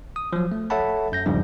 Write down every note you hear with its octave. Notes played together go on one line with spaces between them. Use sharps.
D#6
F3 F#3
A3
A4 C#5 E5 F#5 A5 B5
F#2 G6 A#6
E2 G#2 C#3 F3 G3 D4